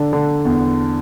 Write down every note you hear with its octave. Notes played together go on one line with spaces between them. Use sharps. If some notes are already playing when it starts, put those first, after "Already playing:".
Already playing: D3 D4
D3
E2